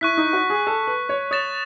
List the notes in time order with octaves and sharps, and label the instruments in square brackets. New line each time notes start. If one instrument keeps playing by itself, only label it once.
[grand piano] E4 [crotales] C#6 F#6 B6
[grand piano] D#4
F#4
G#4
A4
B4
C#5
[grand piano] C#5 [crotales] D#6 A6 E7